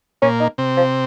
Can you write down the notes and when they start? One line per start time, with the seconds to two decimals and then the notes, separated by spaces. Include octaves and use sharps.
0.22 A#2 A#3 C#4
0.40 D#4
0.58 C3 C4
0.77 F3